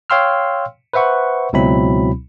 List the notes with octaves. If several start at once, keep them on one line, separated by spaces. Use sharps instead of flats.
C#5 F5 G5 C6 E6 F6
B4 C5 E5 F#5 C#6
C#2 B2 F#3 C4 E4 B5